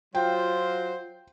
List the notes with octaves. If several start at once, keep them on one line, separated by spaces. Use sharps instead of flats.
F#3 F4 C5 G5